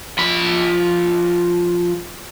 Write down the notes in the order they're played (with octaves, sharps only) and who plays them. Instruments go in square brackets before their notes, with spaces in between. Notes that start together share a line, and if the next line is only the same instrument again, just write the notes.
[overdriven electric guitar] F3 B5